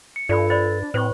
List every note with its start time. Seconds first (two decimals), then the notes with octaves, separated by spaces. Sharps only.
0.16 C#7
0.29 G2 F4 A4 D5 B5
0.50 C5 D5 B5 A6
0.81 D4
0.94 A2 C4 B4 C5 C#6